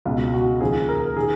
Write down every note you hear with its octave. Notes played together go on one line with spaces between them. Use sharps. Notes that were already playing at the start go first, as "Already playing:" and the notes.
C#2 B2 F4
F#4
D#2 C#3 F3 G#4
A#4
D#3 G#4